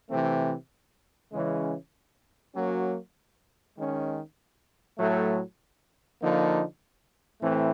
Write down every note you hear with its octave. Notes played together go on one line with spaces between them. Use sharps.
C3 E3 A3 C4
C#3 E3 G#3 C#4
F#3 A#3 C#4 F#4
D#3 G#3 C#4
A2 F#3 A3
D3 F3 A#3 D#4
A2 E3 A3 C4